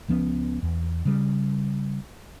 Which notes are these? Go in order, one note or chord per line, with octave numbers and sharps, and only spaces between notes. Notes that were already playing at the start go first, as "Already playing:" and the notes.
C#2 F3 B3 C#4
E2
C#3 G3